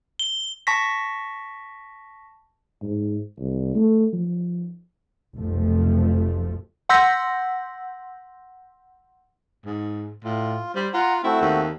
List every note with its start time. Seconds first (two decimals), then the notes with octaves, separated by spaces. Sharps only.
0.19 G7
0.67 A5 C#6 A#6 B6
2.82 G#2
3.39 C2
3.75 A3
4.13 F3
5.35 F1 B1 F2 F3 A3
6.89 F#5 C6 E6 G6 A#6 B6
9.65 G#2
10.24 A2 F4
10.75 G3 C5
10.94 F4 F#5 A#5
11.24 A3 C4 E4 F#4
11.42 D#2